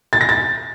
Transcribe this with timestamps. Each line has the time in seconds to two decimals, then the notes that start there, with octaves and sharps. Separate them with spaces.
0.13 A6
0.21 A#6
0.29 A6